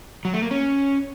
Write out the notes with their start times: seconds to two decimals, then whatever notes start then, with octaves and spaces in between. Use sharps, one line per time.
0.25 F#3
0.33 A3
0.42 A#3
0.51 C#4